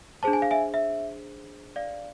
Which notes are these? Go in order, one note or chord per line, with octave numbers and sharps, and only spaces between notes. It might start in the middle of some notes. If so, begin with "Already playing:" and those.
D4 G#4 C5 A5
G#5
F5
E5 G#5
E5
D5 F5